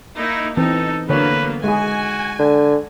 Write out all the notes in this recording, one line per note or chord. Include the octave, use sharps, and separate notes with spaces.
A#3 D#4 E4
E3 C4 D#4 A4
D3 F#3 A#3 B3 B4 C#5
G#3 F#4 G#4 G#5
D3